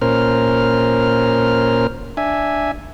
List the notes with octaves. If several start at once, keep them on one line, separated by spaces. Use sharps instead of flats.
A#2 C#4 A#4 C5 F6
D4 E5 G#5